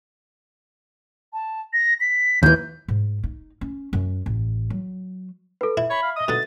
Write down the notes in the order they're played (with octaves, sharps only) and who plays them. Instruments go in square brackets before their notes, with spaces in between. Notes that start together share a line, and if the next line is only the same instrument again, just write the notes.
[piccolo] A5
A#6
B6
[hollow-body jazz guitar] D#2 E3 [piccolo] G6
[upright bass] G#2
D#4
C#4
F#2
A1
F#3
[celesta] A4 B4
[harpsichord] E4 [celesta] E5
[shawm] C#5 [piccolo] B5
[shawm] F5
[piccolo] D#5 [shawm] D#6
[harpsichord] B2 D3 D#4 [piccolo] A6